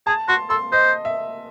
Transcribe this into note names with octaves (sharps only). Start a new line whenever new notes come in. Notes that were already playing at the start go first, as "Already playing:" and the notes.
G#4 A5
F#4 C6
A4 C6
C5 D#5
E5